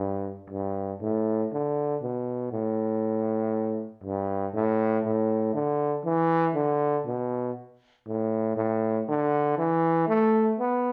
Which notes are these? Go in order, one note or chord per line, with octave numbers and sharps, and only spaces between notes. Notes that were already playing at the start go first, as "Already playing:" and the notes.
Already playing: G2
G2
A2
D3
B2
A2
G2
A2
A2
D3
E3
D3
B2
A2
A2
D3
E3
A3
B3